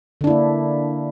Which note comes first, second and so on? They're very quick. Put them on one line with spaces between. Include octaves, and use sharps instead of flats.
D3 D4 E4 A#3